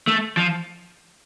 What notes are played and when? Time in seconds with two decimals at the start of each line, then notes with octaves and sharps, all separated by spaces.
0.07 A3
0.37 F3